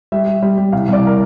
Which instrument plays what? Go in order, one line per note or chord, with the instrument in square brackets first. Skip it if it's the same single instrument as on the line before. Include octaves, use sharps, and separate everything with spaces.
[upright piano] G3 E5
G3
G3
G3
C2 F5
C2 D5
A#4